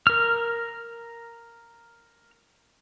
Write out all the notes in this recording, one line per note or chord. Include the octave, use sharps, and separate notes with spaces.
A#4 F6